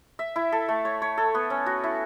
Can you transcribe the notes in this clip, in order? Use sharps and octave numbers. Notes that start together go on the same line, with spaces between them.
E5
E4
A4
A3
C#5
C#5
A4
B3
C#4
F#4
E4